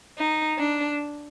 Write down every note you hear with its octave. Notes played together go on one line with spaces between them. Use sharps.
D#4
D4